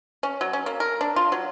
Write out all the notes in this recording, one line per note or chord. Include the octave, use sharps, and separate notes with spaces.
C#4
F#3
C#4
A#3
A#4
D4
F4
F#3